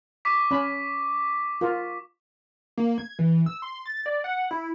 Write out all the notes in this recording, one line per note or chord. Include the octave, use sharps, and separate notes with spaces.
C#6 D6 B6
C#4 B5
F4 A#4
A#3
G#6
E3
E6
C6
A6
D5
F#5
E4